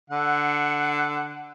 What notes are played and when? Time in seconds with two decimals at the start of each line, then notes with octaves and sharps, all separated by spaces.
0.10 D3 F#5